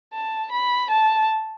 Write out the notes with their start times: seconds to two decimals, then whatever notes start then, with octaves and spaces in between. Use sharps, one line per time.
0.14 A5
0.52 B5
0.90 A5